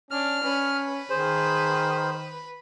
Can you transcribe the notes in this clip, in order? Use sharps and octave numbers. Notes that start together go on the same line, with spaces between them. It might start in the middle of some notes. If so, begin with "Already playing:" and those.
C#4 D4 F6
C#4 B4
D#3 G#4 C5